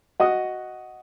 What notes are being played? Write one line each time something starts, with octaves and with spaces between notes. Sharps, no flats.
F#4 D#5 F#5 D#6